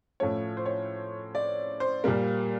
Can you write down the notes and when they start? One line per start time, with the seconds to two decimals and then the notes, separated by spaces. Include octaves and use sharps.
0.20 A2 F3 A3 C#4 C#5
0.57 C5
0.66 C#5
1.35 D5
1.80 C5
2.04 A#2 G3 A#3